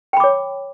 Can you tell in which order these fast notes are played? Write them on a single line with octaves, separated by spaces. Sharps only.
G5 B5 D6 C#5